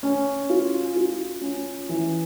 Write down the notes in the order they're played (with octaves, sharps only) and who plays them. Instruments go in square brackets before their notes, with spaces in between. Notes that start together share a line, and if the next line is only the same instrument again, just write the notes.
[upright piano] C#4
F4
F4
C#4
E3